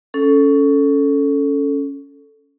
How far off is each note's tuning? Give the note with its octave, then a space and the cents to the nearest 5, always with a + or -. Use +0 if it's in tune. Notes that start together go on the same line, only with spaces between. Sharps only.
C#4 +10 A4 +0